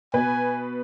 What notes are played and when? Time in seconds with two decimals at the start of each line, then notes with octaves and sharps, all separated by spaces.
0.14 B2 B4 G#5